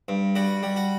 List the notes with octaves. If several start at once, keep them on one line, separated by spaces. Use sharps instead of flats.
G2
G3 F#4
G3
F#4